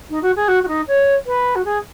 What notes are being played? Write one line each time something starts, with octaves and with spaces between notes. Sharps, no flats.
D#4
F#4
G#4
F#4
F#4
D#4
C#5
B4
F#4
G#4